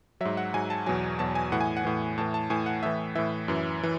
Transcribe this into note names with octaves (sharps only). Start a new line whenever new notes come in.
G#2 F#3 E5
F#5
G#2 F#3 G#5
A5
E2 B2 F#3 G#5
E2 B2 F#3 A5
G#5
A2 E3 F#5
G#5
F#5
A2 E3
A2 E3 A5
A5
A2 E3 G#5
F#5
A2 E3 E5
A2 E3 E5
F#2 E3
E3